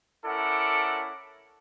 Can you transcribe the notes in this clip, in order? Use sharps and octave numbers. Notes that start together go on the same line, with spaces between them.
C#4 E4 A4 A#4 D5 F#5